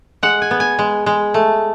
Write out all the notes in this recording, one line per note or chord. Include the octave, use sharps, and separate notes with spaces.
G#3 F#5
G#5
B3
G#5
G#3
G#3
A3